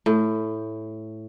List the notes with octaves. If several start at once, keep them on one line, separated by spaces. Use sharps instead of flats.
A2